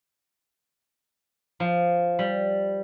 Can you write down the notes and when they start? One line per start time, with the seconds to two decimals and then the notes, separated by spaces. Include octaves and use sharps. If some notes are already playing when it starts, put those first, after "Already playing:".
1.60 F3
2.19 G3